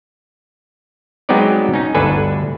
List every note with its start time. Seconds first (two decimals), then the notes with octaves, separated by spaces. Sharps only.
1.29 F#3 G#3 B3 C4 D#4 D5
1.74 C#4 D#4
1.94 G1 D2 D4 A4 B4 G#5